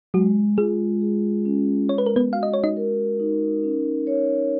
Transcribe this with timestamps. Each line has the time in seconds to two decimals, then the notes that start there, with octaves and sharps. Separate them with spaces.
0.14 F#3 G#3 F#4
0.57 G#3 F4 G#4
1.01 G#4
1.45 C#4
1.89 G#3 C#5
1.98 B4
2.06 A#4
2.16 B3 B4
2.32 F#4 F5
2.43 D#5
2.53 C#5
2.64 D#4 D#5
2.77 A#4
3.20 D#4
3.64 C#4
4.07 C#5